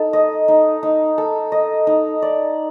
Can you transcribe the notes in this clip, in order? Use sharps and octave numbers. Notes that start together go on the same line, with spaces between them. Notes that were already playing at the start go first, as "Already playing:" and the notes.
Already playing: D#4 A4
D#5
D#4
D#4
A4
D#5
D#4
D5